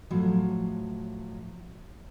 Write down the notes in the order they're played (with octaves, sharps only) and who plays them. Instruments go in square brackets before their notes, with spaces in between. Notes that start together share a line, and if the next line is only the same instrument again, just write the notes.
[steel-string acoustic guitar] A2 F3 F#3